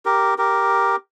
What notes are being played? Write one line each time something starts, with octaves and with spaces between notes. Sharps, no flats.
G4 A#4
G4 A#4